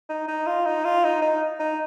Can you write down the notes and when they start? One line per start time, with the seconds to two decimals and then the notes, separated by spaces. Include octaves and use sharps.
0.09 D#4
0.28 D#4
0.47 F4
0.66 D#4
0.85 F4
1.04 D#4
1.22 D#4
1.59 D#4